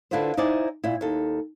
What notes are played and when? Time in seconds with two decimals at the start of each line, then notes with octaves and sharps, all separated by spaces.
0.11 D3 D4 E4 F4 B4 C5
0.37 D#4 E4 C5 D5 D#5 G#5
0.84 A#2 E4
1.01 D#2 A4